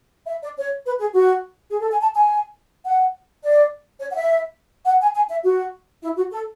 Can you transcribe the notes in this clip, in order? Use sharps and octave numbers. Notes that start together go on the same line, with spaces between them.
E5
D5
C#5
B4
G#4
F#4
G#4
A4
G#5
A5
G#5
F#5
D5
C#5
F#5
E5
F#5
G#5
G#5
E5
F#4
E4
F#4
A4